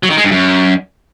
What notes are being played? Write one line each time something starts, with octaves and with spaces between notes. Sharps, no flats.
F#3
D#3
G#3
G2
F#2